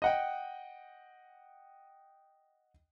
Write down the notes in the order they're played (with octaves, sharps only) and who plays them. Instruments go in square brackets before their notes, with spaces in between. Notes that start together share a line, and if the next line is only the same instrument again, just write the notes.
[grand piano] D#5 F#5 G5